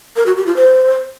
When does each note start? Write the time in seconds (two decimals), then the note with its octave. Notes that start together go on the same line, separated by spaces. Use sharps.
0.16 A#4
0.26 F#4
0.36 G4
0.46 F4
0.56 C5